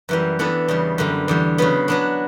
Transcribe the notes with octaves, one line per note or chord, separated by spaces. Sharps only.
F#2 E3 G3
E3 B3 D4 A4
E2 C#3 G3
F#2 D3 G3
E2 D3 G3
C#3 F#3 B3
F#3 B3 D4